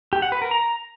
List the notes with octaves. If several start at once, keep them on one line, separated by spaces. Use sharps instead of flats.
G4
F#5
B4
A#4
A#5